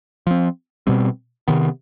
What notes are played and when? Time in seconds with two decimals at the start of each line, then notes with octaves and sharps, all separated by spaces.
0.27 F3 C4
0.87 B2 G3 C4
1.48 C3 D#3 B3